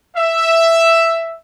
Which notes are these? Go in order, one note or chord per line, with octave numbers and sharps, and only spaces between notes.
E5